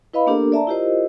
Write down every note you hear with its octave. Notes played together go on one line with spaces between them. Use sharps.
E4 B4 D#5 F5 B5
A#3 B3 D4 G4 A4 A#4
D5 E5 A5 A#5
E4 F4 G4 A#4 C5 D#5